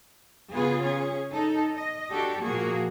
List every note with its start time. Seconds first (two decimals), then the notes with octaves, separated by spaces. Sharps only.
0.53 C#3 B3 F4 G#4 B4
0.85 C#4 G#4
1.32 D#4 A4
1.76 D#5
2.12 D4 F#4 G4 A4
2.44 A#2 F3 A#3 F#4 G#4